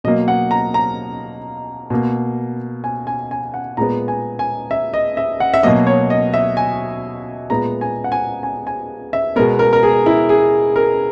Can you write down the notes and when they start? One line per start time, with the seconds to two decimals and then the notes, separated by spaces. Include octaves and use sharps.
0.04 B2 F#3 A#3 D#5
0.28 F#5
0.51 A#5
0.74 A#5
1.90 B2 A#3
2.84 G#5
3.07 G#5
3.31 G#5
3.54 F#5
3.77 A#2 G#3 B3 A#5
4.08 G#5
4.39 G#5
4.71 E5
4.94 D#5
5.17 E5
5.40 F#5
5.54 E5
5.63 B2 F#3 A#3 D#5
5.87 C#5
6.10 D#5
6.34 E5
6.57 G#5
7.50 A#2 G#3 B3 A#5
7.81 G#5
8.04 F#5
8.12 G#5
8.43 G#5
8.67 G#5
9.13 E5
9.36 B2 G#3 B3 A#4
9.59 A#4
9.73 A#4
9.83 G#4
10.06 E4
10.29 G#4
10.76 A#4